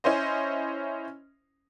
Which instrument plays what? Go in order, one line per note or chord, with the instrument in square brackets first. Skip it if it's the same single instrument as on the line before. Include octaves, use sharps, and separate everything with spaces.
[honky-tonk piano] C#4 E4 C5 D#5